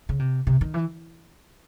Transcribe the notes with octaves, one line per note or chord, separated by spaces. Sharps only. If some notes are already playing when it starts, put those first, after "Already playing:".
C#3
C3
C3
D#3
E3